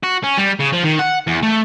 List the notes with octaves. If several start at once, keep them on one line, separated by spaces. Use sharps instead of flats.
F#4
C#4
G3
C#3
F3
D#3
F#5
E2
A3